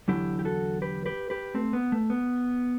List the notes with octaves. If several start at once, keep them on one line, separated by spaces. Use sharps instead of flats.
E2 D3 F#3 E4 G4
G4
F#4 A4
G4 B4
G4 B4
G4 B4
A3 C4
B3
A3
B3